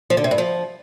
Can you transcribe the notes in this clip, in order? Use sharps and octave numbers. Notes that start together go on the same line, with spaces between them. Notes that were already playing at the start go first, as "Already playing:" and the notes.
F3
D3
C3
G2
F3